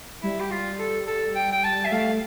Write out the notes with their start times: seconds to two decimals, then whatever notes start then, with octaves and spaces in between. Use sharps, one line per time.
0.22 G3 E4
0.40 G4
0.51 F4
0.79 A4
1.07 A4
1.35 G5
1.52 G5
1.64 A5
1.85 E5
1.92 A3 F5